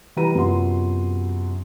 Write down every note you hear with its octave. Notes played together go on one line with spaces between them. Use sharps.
E3 G3 E4 B4 A#5 D#7
F#2 C3 B3 F4 C6